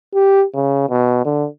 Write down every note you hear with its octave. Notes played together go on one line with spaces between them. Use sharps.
G4
C#3
B2
D3